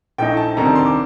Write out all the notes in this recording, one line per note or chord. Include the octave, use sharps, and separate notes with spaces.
A#1 A2 A3 D#4 G5
A5
D2 C3 D#3 G3 A#5
A5
C6
D6